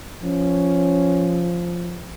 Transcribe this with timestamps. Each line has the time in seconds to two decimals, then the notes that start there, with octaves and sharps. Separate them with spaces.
0.24 F3 C#4